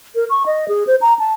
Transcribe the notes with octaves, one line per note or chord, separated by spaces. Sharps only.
A#4
C#6
D#5
G#4
C5
A#5
A5